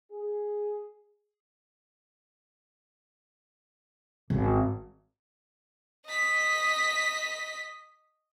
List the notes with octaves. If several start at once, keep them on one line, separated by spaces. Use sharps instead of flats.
G#4
G#1
D#5 B6